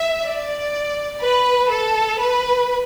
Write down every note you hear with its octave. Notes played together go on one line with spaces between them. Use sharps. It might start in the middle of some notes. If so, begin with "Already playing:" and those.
Already playing: E5
D5
B4
A4
B4